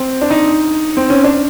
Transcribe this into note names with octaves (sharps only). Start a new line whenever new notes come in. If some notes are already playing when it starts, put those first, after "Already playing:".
Already playing: C4
D4
D#4
C4
C#4
D4